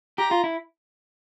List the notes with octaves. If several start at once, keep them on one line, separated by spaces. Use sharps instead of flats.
G4 A#5
F4
E4